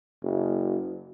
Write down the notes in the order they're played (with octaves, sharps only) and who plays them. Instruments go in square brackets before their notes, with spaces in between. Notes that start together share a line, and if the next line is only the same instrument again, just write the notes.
[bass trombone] F#1